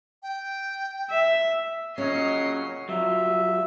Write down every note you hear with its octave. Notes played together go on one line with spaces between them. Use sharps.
G5
E5
A#2 C#3 F#3 C#4 C#5 D#5 C7
F#3 G3 F4 E5